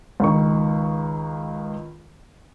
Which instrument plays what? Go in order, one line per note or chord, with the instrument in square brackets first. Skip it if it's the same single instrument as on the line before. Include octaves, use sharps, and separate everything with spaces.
[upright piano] C#2 D#3 C#6